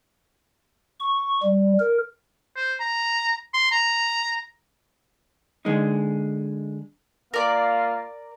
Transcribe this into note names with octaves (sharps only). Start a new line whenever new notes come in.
C#6
G3
A#4
C5
A#5
C6
A#5
D3 G#3 D#4
A#3 F4 A#4 D5 F5